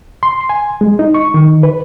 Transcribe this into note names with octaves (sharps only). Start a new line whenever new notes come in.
C6
G#5
G#3
D#4
C#6
D#3
B4